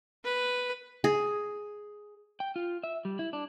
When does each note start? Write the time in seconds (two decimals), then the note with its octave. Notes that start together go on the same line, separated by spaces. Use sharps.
0.25 B4
1.04 G#4
2.40 G5
2.56 F4
2.84 E5
3.05 G3
3.19 E4
3.33 D4